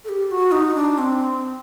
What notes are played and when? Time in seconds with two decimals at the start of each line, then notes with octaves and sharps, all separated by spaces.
0.05 A4
0.09 G4
0.28 G4
0.31 F#4
0.52 D#4
0.75 D4
0.98 C4